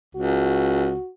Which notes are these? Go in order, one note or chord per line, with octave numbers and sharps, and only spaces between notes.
C#2 F#4